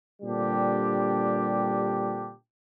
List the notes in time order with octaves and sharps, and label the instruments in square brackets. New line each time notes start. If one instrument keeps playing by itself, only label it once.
[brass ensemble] A#2 D3 G3 C4 D4 G4